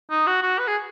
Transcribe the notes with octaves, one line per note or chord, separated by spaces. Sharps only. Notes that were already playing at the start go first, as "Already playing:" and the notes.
D#4
F#4
F#4
B4
G#4